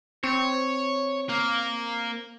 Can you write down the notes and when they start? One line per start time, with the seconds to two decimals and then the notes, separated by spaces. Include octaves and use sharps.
0.24 C4 C#5
1.29 A#3